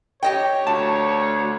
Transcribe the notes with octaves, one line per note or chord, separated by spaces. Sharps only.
G4 C#5 D#5 G5
D2 A5